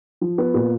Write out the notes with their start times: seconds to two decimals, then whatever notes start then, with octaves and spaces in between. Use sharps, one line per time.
0.21 F3
0.38 B3
0.54 A#2